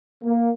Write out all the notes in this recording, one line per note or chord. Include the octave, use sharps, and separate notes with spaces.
A#3